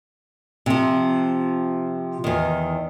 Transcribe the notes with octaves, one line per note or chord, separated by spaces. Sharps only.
C3 F3
E2 D#3